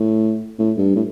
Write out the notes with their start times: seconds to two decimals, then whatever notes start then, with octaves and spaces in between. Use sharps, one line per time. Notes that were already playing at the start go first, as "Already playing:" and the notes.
Already playing: A2
0.59 A2
0.78 G2
0.95 A2